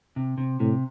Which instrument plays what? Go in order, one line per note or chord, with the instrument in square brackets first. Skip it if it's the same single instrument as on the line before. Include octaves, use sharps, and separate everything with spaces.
[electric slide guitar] C3
C3
[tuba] A2 [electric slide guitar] C3